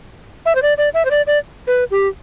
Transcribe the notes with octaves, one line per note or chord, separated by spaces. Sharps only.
E5
C5
D5
D5
E5
C5
D5
D5
B4
G4